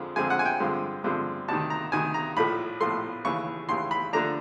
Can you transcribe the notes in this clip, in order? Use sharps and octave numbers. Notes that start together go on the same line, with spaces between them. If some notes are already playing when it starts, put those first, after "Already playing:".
Already playing: F2 D3 F3 G#3 C4
F2 D3 F3 G#3 C4 G#5
F#5
G#5
G5
G2 D3 F3 G#3 C4
G2 D3 F3 G#3 C4
D2 C3 D#3 A5
A#5
D2 C3 D#3 G#5
A#5
A#1 A2 F3 A3 B5
A#1 A2 F3 A3 C6
D#2 C#3 E3 C#6
D#2 C#3 E3 C6
B5
D3 F3 A3 D4 A#5